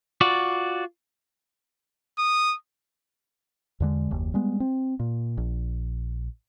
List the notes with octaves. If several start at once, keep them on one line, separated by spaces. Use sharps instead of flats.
F4 F#4 D5
D#6
E2 D3 G#3
F#1 D#2
G3 G#3 B3
C4
A#2
A#1